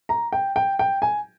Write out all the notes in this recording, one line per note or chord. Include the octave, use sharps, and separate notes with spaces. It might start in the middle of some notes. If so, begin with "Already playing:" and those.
A#5
G5
G5
G5
G#5